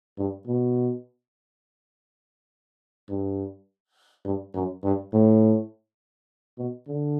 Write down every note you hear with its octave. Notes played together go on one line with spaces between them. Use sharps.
G2
B2
G2
G2
F#2
G2
A2
B2
D3